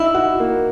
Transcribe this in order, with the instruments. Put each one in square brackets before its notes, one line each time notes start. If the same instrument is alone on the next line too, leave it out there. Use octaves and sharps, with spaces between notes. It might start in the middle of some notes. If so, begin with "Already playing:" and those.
Already playing: [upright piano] D#4 [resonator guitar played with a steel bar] E4
[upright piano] F#4
A#3